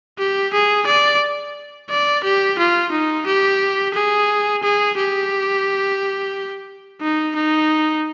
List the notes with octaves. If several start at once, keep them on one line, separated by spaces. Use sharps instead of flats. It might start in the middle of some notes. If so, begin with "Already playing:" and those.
G4
G#4
D5
D5
G4
F4
D#4
G4
G#4
G#4
G4
D#4
D#4